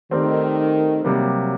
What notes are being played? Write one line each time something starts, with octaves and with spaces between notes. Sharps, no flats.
D#3 A3 C4 G4 A#4 D5
C3 F#3 G3 A#3